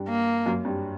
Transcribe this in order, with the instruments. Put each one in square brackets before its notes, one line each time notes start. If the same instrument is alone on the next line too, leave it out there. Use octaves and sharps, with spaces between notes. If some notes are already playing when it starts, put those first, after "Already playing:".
Already playing: [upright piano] G2 G3
[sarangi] A#3
[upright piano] F#2 F#3
G2 G3